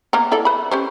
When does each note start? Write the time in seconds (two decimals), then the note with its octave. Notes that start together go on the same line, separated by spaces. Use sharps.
0.13 A#3 B3 A#4
0.32 E4 A4 D5
0.45 B4 B5
0.71 C#4 G4 C5